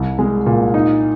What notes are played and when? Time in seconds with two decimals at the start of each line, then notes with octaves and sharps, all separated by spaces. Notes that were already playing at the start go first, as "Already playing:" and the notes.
Already playing: C2
0.19 G#3
0.46 A#2
0.74 D#4